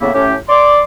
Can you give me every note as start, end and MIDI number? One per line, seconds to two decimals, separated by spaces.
0.01 0.10 45
0.01 0.10 49
0.01 0.10 58
0.01 0.10 59
0.01 0.10 64
0.15 0.35 45
0.15 0.35 61
0.15 0.35 67
0.49 0.81 74
0.49 0.81 84
0.49 0.81 86